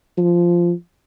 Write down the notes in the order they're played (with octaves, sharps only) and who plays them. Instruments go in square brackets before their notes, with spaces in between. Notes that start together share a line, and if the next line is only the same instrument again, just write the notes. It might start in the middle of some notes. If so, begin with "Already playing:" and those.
[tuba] F3